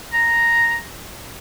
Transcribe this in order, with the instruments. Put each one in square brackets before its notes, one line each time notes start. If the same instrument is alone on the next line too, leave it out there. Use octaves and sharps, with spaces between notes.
[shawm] A#5